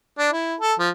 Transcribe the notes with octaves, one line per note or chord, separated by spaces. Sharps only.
D4
E4
A4
F3